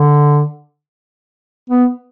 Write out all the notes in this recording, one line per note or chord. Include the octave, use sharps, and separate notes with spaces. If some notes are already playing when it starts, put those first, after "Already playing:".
Already playing: D3
B3